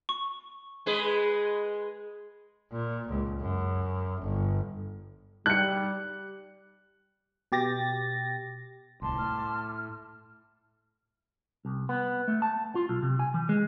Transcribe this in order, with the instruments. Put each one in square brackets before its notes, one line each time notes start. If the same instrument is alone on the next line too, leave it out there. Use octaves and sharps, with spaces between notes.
[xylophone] C#6
[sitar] G#3 G#4 B4
[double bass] A#2
C#2
F#2
G1
[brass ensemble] G3 [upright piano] F#6 C#7
[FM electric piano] B2 G4 A6 A#6
[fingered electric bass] D1 C2 [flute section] A5 C6 D6
[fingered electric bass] A2 [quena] F6
[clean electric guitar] C2
B3
A3
A5
F4
B1
C3
G#5
E3
G#3